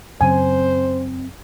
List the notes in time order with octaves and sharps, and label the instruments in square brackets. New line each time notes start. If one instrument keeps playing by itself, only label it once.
[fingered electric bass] F#2 C#3 F#3 [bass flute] C4 [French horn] C5 [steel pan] G#5